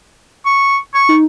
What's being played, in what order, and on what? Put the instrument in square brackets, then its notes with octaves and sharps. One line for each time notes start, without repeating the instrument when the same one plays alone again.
[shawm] C#6
C#6
[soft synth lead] D#4